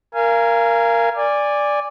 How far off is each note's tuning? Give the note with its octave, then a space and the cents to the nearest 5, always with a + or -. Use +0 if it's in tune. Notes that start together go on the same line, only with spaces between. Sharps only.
A#4 +0 F5 -25 G#5 +0
D5 +0 G#5 -20